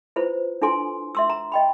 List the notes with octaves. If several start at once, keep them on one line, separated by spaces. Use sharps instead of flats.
E4 F4 B4 C5
D4 E4 F4 A4 G#5 C6
E5 C6 E6
A#5
D#5 G5 B5